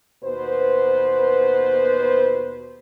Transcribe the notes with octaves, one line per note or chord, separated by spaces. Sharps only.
D#2 B2 B3 B4 C5